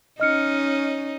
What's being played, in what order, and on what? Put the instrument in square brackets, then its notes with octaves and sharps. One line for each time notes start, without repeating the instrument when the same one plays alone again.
[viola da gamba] C#4 D#4 [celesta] D#5 F6 C#7